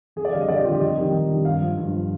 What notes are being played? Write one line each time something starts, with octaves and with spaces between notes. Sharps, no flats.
F2 G#4
D5
D3 G3 F5
D#5
F2 D5
G4
D3 G3 F4
G4
F2 D#5
D#3 G3
F2
D#3 G3
G2 F5
F3
G2
F3